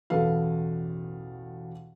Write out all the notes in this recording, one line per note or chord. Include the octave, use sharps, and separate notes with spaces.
A1 E2 B2 A4 B4 F5